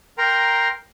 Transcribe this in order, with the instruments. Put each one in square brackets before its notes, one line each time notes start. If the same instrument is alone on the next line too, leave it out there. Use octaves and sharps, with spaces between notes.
[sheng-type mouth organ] A#4 G5 A#5 C6